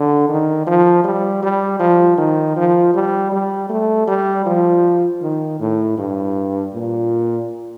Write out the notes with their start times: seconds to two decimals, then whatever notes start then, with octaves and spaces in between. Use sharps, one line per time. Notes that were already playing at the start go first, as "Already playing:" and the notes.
Already playing: D3
0.29 D#3
0.67 F3
1.04 G3
1.43 G3
1.80 F3
2.18 D#3
2.57 F3
2.95 G3
3.32 G3
3.70 A3
4.08 G3
4.46 F3
5.22 D#3
5.60 A2
5.98 G2
6.74 A#2